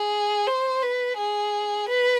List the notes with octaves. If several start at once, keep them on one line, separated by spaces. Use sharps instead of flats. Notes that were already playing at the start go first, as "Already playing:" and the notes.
Already playing: G#4
C5
B4
G#4
B4